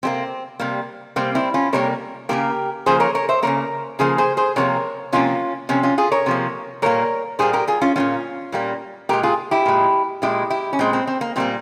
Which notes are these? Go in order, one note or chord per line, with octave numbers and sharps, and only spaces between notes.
C3 G3 A#3 C4
C3 G3 A#3
C3 G3 A#3 C4
C4 E4
C#4 F4
C3 G3 A#3 A#4 C#5
C#3 F3 A#3 G4 A#4
C#3 F3 A#3 G#4 C5
A#4 C#5
A#4 C#5
C5 E5
C#3 F3 A#3 A#4 C#5
C#3 F3 A#3 G#4 C5
G#4 C5
G#4 C5
C3 F3 A#3 A#4 C#5
C3 F3 A#3 C#4 F4
C3 F3 A#3 C#4
C#4 F4
F4 G#4
A#4 C#5
C3 F3 A#3
A#2 G3 A#3 A#4 C#5
A#2 G3 A#3 G#4 C5
G4 A#4
F4 G#4
C#4 F4
A#2 G3 A#3 C#4 F4
A#2 G3 A#3
A#2 G#3 G4 A#4
F4 G#4
E4 G4
A#2 G#3
A#2 G#3 E4 G4
E4 G4
C#4
A#2 G#3 C4
C4
C4
A#3
A#2 G3 A#3 C4